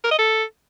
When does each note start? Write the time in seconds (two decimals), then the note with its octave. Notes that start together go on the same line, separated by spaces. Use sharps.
0.04 A#4
0.11 D#5
0.18 A4